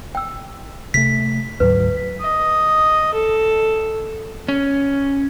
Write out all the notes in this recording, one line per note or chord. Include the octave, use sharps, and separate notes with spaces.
G5 E6
C3 A3 B6
D2 G#2 F#3 B4
D#5
A4
C#4